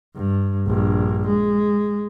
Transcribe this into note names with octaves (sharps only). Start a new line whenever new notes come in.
G2
A#1 G2
G#3